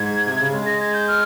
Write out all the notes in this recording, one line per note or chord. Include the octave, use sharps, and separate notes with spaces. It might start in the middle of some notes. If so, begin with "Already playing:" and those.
Already playing: G#2 G#6
C3
C#3
G#3
A#6
G#6
G6
F6